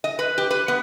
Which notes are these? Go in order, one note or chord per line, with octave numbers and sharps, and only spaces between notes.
D#5
B4
G4
B4
B3